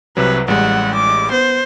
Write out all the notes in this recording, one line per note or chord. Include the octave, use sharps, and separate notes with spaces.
C2 C3 F#3 B4
A1 G3 G#3 F#5
D6
B3 C5